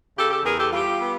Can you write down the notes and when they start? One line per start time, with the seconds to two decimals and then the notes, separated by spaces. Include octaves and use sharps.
0.17 C#3 G4 A4
0.30 G4 A4
0.44 E2 G#4 A#4
0.58 G4 A4
0.72 G3 F4 G4
1.00 B3